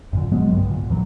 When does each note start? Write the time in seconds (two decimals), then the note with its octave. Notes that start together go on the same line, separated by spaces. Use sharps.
0.13 F#2 A#2 D3
0.32 F#3 G#3 B3
0.50 B1 G2 D3
0.69 A#2
0.89 D#2 E3 F#3